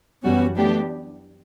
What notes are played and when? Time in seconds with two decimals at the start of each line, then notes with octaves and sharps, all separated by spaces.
0.23 F#2 E3 G3 B3 C#4 F#4
0.56 E3 A3 B3 D4 G4